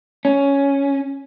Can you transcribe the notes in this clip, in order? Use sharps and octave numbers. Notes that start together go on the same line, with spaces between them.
C#4